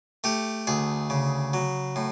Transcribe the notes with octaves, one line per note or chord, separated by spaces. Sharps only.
A3 G4
D2 G#4
C#3
F#3
A2